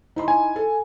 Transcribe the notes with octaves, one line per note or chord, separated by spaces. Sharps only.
D#4 E4 C6
G#5
A4